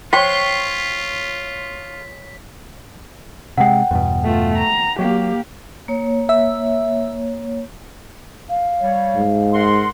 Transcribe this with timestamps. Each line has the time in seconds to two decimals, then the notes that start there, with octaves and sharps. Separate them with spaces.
0.13 F4 C5 C#5 G5 C6 C#6 B6
3.57 C3 G#3 F#5 G5
3.91 E2 G2 B2
4.25 A3 F4
4.58 A#5
4.99 F#3 A#3 G4
5.88 A#3 C#5
6.29 E5
8.50 F5
8.81 G3 C#5
9.16 G#2
9.53 A#4 F#5 C6